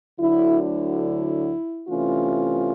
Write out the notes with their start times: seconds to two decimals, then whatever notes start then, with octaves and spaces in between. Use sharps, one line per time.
0.19 D2 D3 F#3 E4
0.62 E4
1.88 C3 E3 A3 C#4 F4